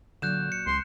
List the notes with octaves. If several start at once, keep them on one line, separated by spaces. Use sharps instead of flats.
A#2 D3 F#3 F#6 G6 E7
C#7
C#2 C6